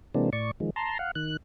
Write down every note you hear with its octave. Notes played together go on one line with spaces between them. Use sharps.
C3 E3 G#3 A#3 C4 D4
A2 D5 C#6
D#3 F3 G#3
A5 A#5 C6
F5 F#5
D#3 F#6